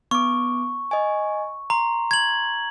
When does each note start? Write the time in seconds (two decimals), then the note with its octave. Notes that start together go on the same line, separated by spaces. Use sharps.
0.11 B3 C#6 D6
0.91 D#5 G#5
1.70 A#5 C6
2.11 G#6 F#7